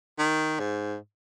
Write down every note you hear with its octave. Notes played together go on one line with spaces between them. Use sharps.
D#3
G#2